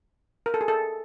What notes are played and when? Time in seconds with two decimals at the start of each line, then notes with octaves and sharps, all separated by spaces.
0.46 A#4
0.54 A4
0.61 G#4
0.68 A4